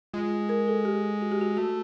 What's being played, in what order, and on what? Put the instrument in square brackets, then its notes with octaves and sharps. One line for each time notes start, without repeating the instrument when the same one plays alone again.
[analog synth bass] G#3 [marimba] F4
[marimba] A#4
A4
G4
F#4
G4
F#4
[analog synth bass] A3 [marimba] F#4